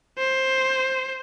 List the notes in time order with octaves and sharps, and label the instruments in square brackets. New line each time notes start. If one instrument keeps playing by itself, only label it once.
[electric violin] C5